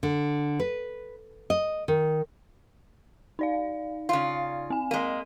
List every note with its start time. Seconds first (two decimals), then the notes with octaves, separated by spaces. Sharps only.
0.03 D3
0.60 B4
1.50 D#5
1.88 D#3
3.39 D#4 D5 F5
4.09 C#3 F4
4.70 C4 G#5
4.91 G#3 A#3 D#5 D#7